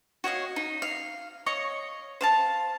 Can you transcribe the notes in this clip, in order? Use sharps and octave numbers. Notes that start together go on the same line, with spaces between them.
F#4 C#5 D#5 F5
D#4
F5
C#5 D#5 C#6
C5 F5 A5